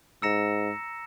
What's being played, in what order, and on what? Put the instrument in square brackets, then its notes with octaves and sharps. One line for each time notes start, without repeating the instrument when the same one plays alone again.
[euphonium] G#2 [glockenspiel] A#5 E6 A#6 C#7 E7